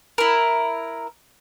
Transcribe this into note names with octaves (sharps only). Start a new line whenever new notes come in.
E4 A#4